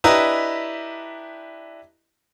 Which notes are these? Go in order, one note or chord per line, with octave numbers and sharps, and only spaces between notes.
D4 E4 G4 B4 D#5 A#5